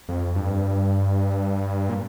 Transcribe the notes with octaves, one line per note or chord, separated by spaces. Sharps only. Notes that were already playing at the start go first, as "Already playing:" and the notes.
F2
G2
A#2